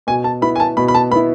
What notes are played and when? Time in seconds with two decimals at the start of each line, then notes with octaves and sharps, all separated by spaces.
0.07 B2 G#5
0.24 A5
0.41 B3 E4 B5
0.56 G#5
0.60 A5
0.77 B2 B5
0.88 B5
0.95 A5
1.11 B3 B5
1.16 E4